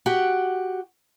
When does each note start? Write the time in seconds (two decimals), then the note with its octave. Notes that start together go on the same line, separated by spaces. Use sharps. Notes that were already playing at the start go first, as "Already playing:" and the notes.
0.06 F#4 G4 F#5